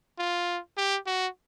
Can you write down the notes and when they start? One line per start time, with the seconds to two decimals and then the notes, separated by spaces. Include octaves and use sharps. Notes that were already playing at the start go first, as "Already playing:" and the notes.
0.19 F4
0.77 G4
1.07 F#4